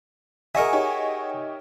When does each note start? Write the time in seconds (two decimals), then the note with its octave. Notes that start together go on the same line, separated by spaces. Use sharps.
0.55 F#4 G#4 A#4 D#5 E5 G#5 C#6 C#7
0.73 D#4 G4 C#5